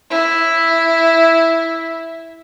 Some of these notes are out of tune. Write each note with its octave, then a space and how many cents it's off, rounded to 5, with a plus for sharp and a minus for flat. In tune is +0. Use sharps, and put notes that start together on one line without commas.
E4 +0